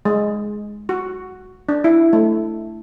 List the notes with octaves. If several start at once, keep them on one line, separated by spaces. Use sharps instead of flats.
G#3
F#4
D4
E4
A3